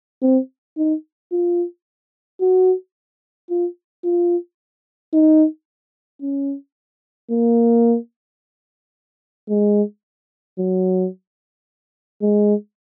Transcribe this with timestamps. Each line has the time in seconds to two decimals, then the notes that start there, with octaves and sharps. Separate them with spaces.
0.22 C4
0.77 D#4
1.32 F4
2.41 F#4
3.50 F4
4.04 F4
5.13 D#4
6.22 C#4
7.31 A#3
9.49 G#3
10.58 F#3
12.22 G#3